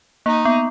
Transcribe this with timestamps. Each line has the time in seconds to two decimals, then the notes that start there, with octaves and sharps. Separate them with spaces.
0.26 A#3 D#4
0.45 B3